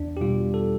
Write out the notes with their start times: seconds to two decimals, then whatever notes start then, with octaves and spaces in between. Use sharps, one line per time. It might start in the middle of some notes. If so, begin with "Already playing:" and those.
Already playing: E2 D4
0.17 G4
0.21 B2 G3 F4
0.54 A4